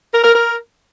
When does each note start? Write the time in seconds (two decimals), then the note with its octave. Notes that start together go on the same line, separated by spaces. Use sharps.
0.13 A#4
0.24 A#4
0.34 A#4